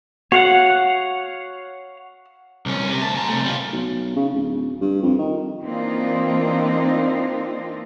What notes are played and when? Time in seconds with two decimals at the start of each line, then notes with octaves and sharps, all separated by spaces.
0.32 F#4 C#5 F5 F#5
2.66 C2 C#4
2.88 C3
3.02 D2 A5
3.16 G#5 A#5
3.29 C3 A3
3.44 G3 F4
3.73 B1
4.16 C#3
4.32 D1
4.81 G2
5.02 F2
5.18 D#3
5.64 E3 A#3 C4 D4 D#4 F4